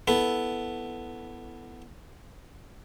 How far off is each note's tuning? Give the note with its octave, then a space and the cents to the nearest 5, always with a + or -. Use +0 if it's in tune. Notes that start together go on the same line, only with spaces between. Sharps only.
B3 +0 E4 +0 A4 +0